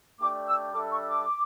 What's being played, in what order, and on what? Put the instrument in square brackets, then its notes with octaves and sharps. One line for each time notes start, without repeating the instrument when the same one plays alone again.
[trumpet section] A3 D4 G4 D5 G5 [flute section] D6
[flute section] E6
[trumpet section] G3 D4 A4 E5 [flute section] D6
[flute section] C#6
D6